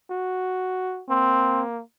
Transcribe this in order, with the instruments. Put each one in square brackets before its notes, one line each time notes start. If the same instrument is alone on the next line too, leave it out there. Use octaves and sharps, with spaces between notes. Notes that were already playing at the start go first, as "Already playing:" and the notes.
[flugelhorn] F#4
[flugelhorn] A#3 [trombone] C4